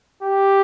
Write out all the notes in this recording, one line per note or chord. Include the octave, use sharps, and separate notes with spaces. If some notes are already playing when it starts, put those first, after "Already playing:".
G4